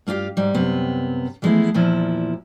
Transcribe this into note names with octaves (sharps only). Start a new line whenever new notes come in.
G2 A#3 F4 G4 F5
G#2 G3
F#2 C3 B3
E3 F3 G#3 A3 B3 E4
E2 A#2 F3 E4